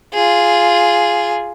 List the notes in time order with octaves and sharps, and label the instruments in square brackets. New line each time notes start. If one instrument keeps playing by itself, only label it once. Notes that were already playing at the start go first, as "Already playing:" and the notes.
[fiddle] F4 G#4